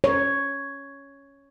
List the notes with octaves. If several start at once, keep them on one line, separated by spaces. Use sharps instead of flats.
C#5